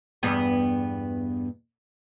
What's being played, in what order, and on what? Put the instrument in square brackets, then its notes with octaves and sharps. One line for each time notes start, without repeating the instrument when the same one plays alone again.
[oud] E2 G2 B3